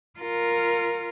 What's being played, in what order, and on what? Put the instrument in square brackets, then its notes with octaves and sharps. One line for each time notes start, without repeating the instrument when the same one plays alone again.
[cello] F4 A#4